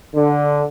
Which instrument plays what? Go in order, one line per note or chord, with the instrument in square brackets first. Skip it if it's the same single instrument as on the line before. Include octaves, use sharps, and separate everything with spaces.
[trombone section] D3